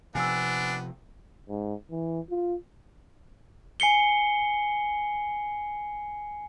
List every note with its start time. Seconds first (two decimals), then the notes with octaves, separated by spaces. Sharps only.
0.15 C3 F3 B3 D4 G#5 E6
1.49 G#2
1.91 E3
2.30 F4
3.80 G#5 C7 C#7 G7